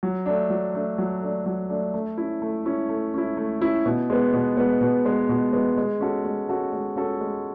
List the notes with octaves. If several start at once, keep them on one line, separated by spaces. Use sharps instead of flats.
F#3
A3 D4
F#3
A3 D4
F#3
A3 D4
F#3
A3 D4
A3
C#4 E4
A3
C#4 E4
A3
C#4 E4
A3
C#4 E4
B2
G#3 B3
B2
G#3 B3
B2
G#3 B3
B2
G#3 B3
G#3
C#4 F#4 A4
G#3
C#4 F#4 A4
G#3
C#4 F#4 A4
G#3